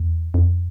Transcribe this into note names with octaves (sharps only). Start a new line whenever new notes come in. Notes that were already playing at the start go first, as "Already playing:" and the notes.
Already playing: E2
F2